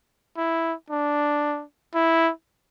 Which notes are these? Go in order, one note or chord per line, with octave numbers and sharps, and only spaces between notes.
E4
D4
E4